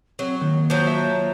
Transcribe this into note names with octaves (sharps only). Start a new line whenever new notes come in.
F#3 C4
D#3 A#3
F3 F#3 A#5 G6
E5